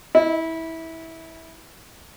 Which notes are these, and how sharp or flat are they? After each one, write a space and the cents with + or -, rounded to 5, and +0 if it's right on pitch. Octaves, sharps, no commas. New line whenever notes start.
E4 -20